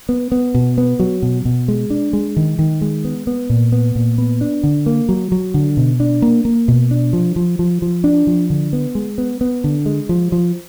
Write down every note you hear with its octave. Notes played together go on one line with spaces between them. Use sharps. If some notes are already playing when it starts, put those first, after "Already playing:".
B3
B3
B2
B3
F#3
B2
B2
G#3
D4
G#3
D#3
D#3
G#3
B3
B3
A#2
B3
A#2
B3
D4
D3
A#3
F#3
F#3
D3
B2
D4
A#3
A#3
B2
D4
F3
F3
F3
F3
D4
F3
D3
B3
G#3
B3
B3
D3
G#3
F3
F3